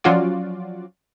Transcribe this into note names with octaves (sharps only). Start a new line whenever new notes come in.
F3 F#3 C#4 F4 F#4 D5